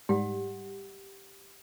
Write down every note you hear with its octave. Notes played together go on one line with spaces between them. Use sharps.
G#2 G3 G4 F#5